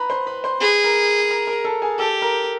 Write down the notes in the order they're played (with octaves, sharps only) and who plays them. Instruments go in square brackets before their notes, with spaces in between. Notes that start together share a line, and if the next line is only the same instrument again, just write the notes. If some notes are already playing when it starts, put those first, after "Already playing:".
Already playing: [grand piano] B4 A#5 B5
C5 C6
B4 B5
C5 C6
[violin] G#4 [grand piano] B4 B5
[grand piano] A#4 A#5
A#4 A#5
A#4 A#5
A4 A5
G#4 G#5
[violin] G4 [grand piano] A4 A5
[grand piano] A#4 A#5